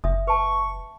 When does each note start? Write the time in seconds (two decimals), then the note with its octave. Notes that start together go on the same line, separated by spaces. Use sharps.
0.04 F#1 D4 E5 D#6
0.27 B4 A5 C#6